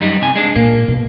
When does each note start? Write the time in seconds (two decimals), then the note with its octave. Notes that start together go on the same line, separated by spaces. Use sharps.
0.01 F#2 G3 D#4
0.21 C3 G#5
0.35 G#3 D4
0.56 A#2 A#3
0.88 B2